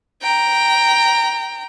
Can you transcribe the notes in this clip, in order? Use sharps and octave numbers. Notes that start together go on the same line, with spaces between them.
G5 A#5